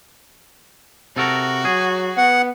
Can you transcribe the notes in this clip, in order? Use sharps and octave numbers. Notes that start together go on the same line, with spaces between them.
C3 F#4 A4 A#4
F#3 G#4
B3 F#5